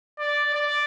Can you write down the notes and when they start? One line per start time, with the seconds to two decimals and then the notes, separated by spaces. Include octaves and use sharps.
0.19 D5
0.54 D5